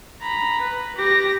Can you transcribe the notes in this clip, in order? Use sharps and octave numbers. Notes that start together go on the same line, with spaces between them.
A#5 B5
B4
G4 A#6